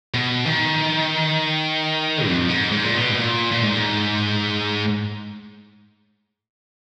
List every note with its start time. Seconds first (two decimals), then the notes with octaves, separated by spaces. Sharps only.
0.14 B2
0.45 D#3
2.27 F2
2.49 G#2
2.72 G#2
2.84 A#2
2.94 B2
3.09 G#2
3.16 A#2
3.52 A#2
3.63 G#2